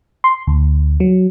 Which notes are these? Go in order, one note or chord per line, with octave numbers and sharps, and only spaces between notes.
C6
D2
F#3